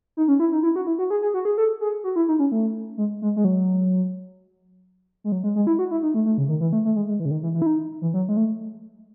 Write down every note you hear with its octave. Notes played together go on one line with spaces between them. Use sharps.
D#4
C#4
E4
D#4
E4
F#4
E4
F#4
G#4
G#4
F#4
G#4
A4
G#4
F#4
E4
D#4
C#4
A3
G#3
G#3
G#3
F#3
G#3
F#3
G#3
G#3
E4
F#4
E4
D#4
A3
A3
C#3
D#3
E3
A3
A3
G#3
G#3
E3
C#3
D#3
E3
E3
E4
D#4
E3
F#3
G#3
A3